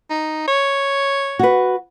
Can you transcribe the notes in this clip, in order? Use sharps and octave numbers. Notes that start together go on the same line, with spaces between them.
D#4
C#5
F#4 B4